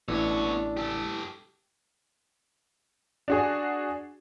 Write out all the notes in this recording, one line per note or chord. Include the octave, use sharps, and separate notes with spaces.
A1 B3 D4 E4 C#5 E6
G4 A4
D4 F#4 G#4